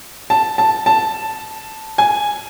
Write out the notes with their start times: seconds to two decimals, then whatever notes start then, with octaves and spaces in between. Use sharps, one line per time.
0.30 A5
0.58 A5
0.86 A5
1.98 G#5